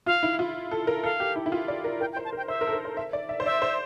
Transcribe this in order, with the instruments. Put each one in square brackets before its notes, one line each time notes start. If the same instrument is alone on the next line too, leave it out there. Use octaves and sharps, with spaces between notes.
[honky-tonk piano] F4 [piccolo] F5
[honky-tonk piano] E4
F4
A4
A#4
[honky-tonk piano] A4 [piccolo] F5
[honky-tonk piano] G4
E4
E4
F4
D5
A#4
[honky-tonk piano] A#4 [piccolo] G5
[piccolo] G5
[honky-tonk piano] C5
[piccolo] A5
[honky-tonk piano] A#4
[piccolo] G5
[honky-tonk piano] C5 [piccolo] E5
[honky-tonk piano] A#4
A4
A#4
C5
E5
D5
E5
C5
[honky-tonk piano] D5 [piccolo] E5
[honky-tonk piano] C5